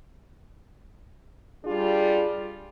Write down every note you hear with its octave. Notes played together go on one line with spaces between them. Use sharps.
G3 D4 F4 G#4